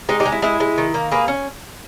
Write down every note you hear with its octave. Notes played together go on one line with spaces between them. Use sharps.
G#3 D#4 G4
D#4 G4
G#3
E4
G#3 E4
G#3
D#3
A#3
A#3 G#4 B4
C#4